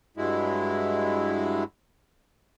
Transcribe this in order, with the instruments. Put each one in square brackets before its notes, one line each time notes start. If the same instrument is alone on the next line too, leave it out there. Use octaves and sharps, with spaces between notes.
[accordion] G2 F#3 G#3 E4